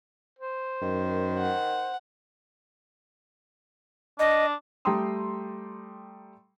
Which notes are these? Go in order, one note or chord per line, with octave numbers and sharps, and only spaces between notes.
C5
F#2 D#3
F#5
D4 D#5
G3 A3 G5 A#5 C6 D#6